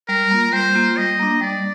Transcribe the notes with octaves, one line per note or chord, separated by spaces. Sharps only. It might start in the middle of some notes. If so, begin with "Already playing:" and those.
G3 A#4
A#3 F4
G3 C5
A#3 F4
G3 D#5
A#3 D4
G3 D5